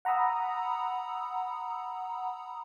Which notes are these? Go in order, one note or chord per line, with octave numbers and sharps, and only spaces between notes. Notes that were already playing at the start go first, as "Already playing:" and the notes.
F#5 A#5 B5 D#6 E6